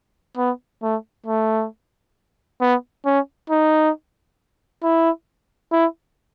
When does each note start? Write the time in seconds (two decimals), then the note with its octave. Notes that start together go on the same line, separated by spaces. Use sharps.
0.37 B3
0.82 A3
1.26 A3
2.61 B3
3.06 C#4
3.50 D#4
4.83 E4
5.72 E4